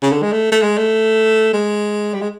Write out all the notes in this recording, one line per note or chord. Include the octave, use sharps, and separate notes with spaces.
C#3
D3
G#3
A3
A3
G#3
A3
G#3
G3
G#3